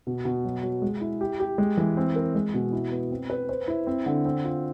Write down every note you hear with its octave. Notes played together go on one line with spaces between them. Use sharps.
B2
B2
F#3
F#3
G#3
E4
G4
G4
G#3
E3
C4
A#4
G#3
B2
E4
B3
C4
B4
C5
E4
C4
D3
C4
F4